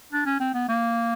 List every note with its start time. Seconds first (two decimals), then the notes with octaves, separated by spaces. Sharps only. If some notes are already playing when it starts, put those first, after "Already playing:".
0.12 D4
0.26 C#4
0.40 C4
0.54 B3
0.69 A#3